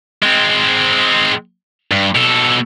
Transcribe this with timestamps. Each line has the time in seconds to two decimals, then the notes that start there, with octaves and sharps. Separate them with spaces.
0.23 G#3 C4
1.91 G2
2.15 B2 A4